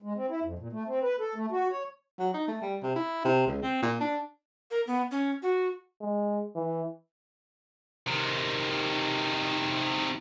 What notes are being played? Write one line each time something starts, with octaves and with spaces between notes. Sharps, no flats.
G#3
C4
E4
F2
A#2
A3
C4
B4
A4
A3
F#4
C#5
F#3
D#4
A3
G3
C3
E4
C3
C#2
C4
A#2
D4
A#4
B3
C#4
F#4
G#3
E3
C3 D#3